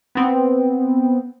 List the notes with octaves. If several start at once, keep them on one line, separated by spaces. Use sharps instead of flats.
B3 C4